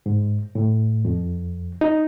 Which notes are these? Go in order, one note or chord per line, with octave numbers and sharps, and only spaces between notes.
G#2
A2
F2
D#4